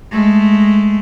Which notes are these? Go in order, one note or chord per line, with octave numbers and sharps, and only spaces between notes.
G#3 A3